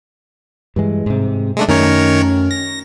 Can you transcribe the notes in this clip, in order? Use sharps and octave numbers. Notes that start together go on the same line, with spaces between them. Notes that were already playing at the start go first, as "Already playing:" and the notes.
G2 E3 G#3
G#2 C3
G#3 A3 D4
F#2 D#3 A3 C#4 A#4 C#5
A#6